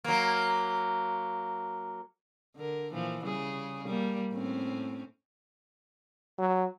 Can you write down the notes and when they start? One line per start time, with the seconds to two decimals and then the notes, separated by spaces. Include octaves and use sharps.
0.04 F#3 A#3
2.56 D3 A#4
2.91 A#2 E3 F3
3.23 C#3 G3 G#4
3.85 G3 A#3
4.33 A2 C4 C#4
6.39 F#3